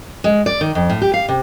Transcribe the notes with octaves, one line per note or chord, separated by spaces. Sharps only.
G#3
D5
D#3
F2
A2
G4
F5
C3